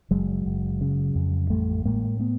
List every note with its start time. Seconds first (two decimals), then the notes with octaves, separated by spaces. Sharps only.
0.11 F#1 F#3 G#3
0.46 F#1
0.81 C#3
1.15 F2
1.50 A1 G3 A3
1.85 A2 G#3 A#3
2.19 A3 B3